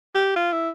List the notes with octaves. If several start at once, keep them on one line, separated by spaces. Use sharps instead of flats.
G4
F4
E4